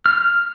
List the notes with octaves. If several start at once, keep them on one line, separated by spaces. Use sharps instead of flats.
F6